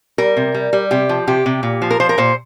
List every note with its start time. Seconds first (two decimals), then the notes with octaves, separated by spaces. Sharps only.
0.18 G3 A#4
0.37 C3
0.54 G3
0.73 G3
0.91 C3 G4
1.09 F3
1.27 C3 G4
1.46 C3
1.63 A#2
1.82 F3
1.91 A#4
2.00 F3 C5
2.09 A#4
2.18 A#2 C5